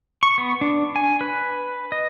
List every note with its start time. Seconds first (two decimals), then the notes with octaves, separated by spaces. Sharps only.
0.23 C#6
0.38 B3
0.61 D4
0.96 G#5
1.21 B4
1.92 D#5